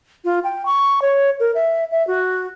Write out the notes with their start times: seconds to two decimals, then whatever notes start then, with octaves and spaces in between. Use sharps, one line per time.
0.25 F4
0.44 G5
0.65 C#6
1.02 C#5
1.40 A#4
1.55 E5
1.91 E5
2.07 F#4